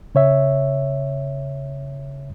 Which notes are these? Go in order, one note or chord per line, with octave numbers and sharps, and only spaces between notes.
C#3 C#5 E5